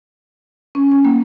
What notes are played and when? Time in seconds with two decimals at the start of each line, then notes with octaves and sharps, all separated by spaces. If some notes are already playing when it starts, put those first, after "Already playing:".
0.75 C#4
0.92 C#4
1.05 A#3